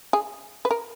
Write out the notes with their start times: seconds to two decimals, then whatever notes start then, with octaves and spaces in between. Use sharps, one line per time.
0.13 G#4
0.65 B4
0.71 A#4